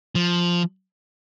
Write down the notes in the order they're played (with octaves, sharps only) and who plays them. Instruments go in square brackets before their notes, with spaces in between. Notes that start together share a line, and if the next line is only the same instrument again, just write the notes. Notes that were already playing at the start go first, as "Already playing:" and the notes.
[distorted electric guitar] F3